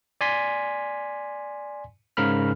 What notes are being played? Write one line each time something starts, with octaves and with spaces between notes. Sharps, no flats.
D5 G#5 C6 B6
G#2 C#3 A#4 B5 F6